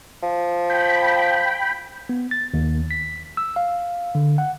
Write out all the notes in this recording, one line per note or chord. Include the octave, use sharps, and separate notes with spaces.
F3
G5 B5
B3
A6
D#2
B6
E6
F5
D3
F#5